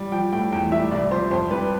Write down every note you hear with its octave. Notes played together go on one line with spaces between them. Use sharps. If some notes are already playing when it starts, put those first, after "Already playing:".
Already playing: G3
F3 G5
A2 G5
E2 G5
G3 E5
C2 D5
F3 C5
F2 C5
G3 B4